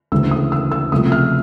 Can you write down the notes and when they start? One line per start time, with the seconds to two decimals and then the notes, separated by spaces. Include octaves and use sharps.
0.12 D2 C#3 E3 G#3 E6
0.31 D#6
0.52 E6
0.71 E6
0.92 C#2 C3 F3 A3 D#6
1.12 F6